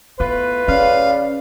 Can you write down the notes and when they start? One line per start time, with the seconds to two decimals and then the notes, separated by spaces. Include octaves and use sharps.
0.20 A2 B3 F4 B4
0.68 C#3 C#4 D5 F5